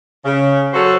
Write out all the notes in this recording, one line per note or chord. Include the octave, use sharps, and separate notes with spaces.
C#3
F#3 F#4 A4 C5 C#5